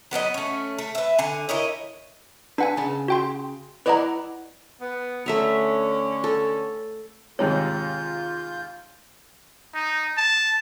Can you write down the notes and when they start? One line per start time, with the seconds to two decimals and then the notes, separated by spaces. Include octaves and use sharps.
0.11 F#3 B3 D#4 D#5
0.34 A3 C#4
0.78 A3
0.95 B4 E5
1.19 D3 G#5
1.49 E4 A#4 C#5 D#5
2.58 D4 B4 F#5 G#5
2.77 C#3 A5
3.08 F#4 G5 C6
3.86 E4 B4 D5 D#5 F#5 A#5
4.81 B3
5.26 D3 A3 C#4 E5 A#5
6.24 A4
7.39 D#2 G#2 C3 F4 C#5 G6
9.74 D#4
10.17 A5